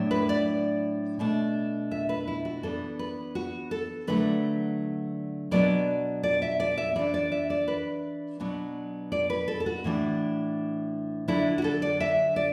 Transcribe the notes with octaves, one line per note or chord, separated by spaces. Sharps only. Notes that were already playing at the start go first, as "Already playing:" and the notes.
Already playing: A2 F#3 D4
B4
D5
B2 A3 D4
E5
B4
E4
F#4
E3 B3 D4 A4
B4
F#4
A4
D3 F#3 A3 D4 B4
B2 F#3 B3 D4 D5
D5
E5
D5
E5
E3 D4 D5
D5
E5
D5
B4
B2 F#3 B3 D4
D5
B4
A4
A4
F#4
A2 E3 D4
D3 F#3 D4 E4
F#4
A4
D5
E5
D5